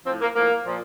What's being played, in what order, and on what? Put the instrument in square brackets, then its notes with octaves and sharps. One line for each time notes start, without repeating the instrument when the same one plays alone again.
[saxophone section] F3 C4
A2
A#3
A2 F3 A#3
A#2 F3